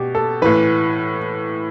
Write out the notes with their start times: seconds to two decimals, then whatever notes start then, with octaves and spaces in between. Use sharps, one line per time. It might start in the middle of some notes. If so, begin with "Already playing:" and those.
Already playing: B2 G4
0.15 A4
0.42 A2 E3 B4